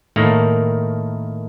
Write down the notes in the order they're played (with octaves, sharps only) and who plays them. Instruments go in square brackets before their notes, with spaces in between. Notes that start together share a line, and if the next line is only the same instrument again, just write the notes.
[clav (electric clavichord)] A2 D#3 A3 A#3